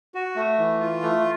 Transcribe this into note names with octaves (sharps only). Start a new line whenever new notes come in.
F#4
A3
E3
F4
A3